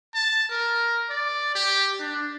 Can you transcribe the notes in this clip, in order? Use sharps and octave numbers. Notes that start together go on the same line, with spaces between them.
A5
A#4
D5
G4
D4